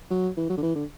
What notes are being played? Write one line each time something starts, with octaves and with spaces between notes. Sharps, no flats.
F#3
E3
F#3
D3
E3
D3